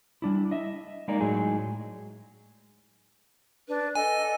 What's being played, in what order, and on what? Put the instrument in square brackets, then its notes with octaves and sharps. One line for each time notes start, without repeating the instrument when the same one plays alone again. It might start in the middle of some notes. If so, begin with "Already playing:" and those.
[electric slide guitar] G3 D4 E4
D#5 E5
G#3 A#3 D#4 D5
A2 F#3 G#3 D#4 G#4
[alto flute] D4 [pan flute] B4
[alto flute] A4 [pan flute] D#5 [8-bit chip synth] G#5